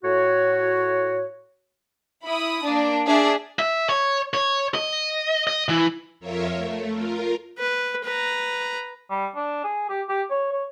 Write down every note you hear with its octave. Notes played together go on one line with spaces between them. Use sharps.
A2 F#4 C#5
E4 B5 D#6
A#3 D4
D4 G#4 D5 E5
E5
C#5
C#5
D#5
D#5
E3
F2 F4 A#4 C#5 E5
A3
F4 A#4
B4
B4 A#5
G3
D4
G#4
G4
G4
C#5
C#5